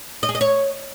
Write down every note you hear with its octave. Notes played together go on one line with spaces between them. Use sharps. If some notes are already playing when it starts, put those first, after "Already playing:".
D#5
G#4
D#5
C#5